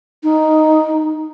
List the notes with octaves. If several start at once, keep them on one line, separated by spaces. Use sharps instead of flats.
D#4